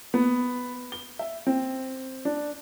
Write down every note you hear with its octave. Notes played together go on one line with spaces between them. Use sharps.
B3
G7
E5
C4
D4